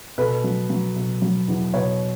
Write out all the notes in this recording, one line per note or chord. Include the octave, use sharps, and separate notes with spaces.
B2 A4 B4
F#3
F#3
B2
F#3
E2
B2 B4 C#5